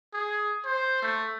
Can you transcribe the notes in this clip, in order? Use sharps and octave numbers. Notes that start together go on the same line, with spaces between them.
G#4
C5
A3